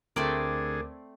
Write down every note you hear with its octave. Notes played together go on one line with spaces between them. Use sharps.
D2 D3 A3 C4 G#4 A#4 D5 D6